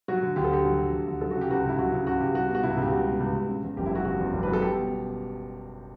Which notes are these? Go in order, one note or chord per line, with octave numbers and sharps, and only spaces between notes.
F#3 F#4
D3
D2 G4
A4
D2 G4
F#3
D3
D2
D2
F#3 A4
C#3 F#4
G4
C#2 F#4
C#2 E4
F#3 F#4
C#3
C#2 F#4
C#2 G4
G3 F#4
B2
F#4
C#2 E4
C#2 G4
G3 F#4
B2
C#2
C#2
C#3
E2
F#1 G4
E4
F#3 F#4
C#3 F#4
E2
F#1
B4
F#3
A4
G3 G4
B2